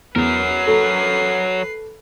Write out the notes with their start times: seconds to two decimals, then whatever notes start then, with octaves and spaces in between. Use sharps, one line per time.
0.15 E2 F#3 A#4 B4 C7
0.67 A4